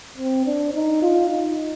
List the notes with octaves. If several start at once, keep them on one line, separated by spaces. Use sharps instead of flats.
C4
D4
D#4
F4
D#4